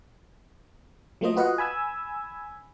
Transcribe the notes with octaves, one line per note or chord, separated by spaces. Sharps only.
F#3 A3 A#3 F4 C5 D#5
F4 F#4 B4 D#5 F5 F#5
G#5 B5 E6 G#6